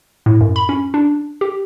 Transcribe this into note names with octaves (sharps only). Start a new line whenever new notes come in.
A2
F#2
B5
C#4
D4
G4